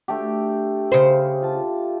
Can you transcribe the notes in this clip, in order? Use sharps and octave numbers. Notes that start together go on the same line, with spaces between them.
A3 D4 G4
C#3 C5
F4 A5